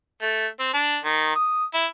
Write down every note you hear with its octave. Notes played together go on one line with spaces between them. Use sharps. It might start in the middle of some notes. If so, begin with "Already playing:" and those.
A3
C4
D4
D#3
D#6
E4